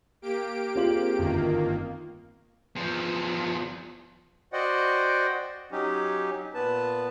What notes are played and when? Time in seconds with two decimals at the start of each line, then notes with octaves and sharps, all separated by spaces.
0.22 A#3 G4 D7
0.76 C4 F4 G#4 C5 F#7
1.18 G1 F#2 D#3 A#3
2.75 E2 F3
4.53 F#4 C5 D5 D#5 F#5 G5
5.72 F#3 C#4 D#4 G4
6.54 A#2 B3 B4 A5